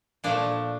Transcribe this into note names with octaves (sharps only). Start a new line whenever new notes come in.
A#2 F3 A3 D4